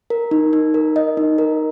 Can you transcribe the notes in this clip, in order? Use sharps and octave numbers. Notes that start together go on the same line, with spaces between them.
A#4
D#4
D#4
A#4
D#5
D#4
A#4